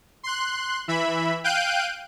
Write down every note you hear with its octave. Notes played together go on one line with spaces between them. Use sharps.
C6 F#6
E3 E5 B5
F5 G5 F#6 G6 D7 D#7